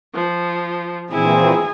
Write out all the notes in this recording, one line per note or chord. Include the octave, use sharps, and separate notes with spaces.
F3
A#2 E3 C4 E4 G#4 G#5